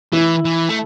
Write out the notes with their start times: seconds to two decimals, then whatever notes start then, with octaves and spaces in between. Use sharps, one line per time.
0.13 E3 E4
0.45 E3
0.69 A3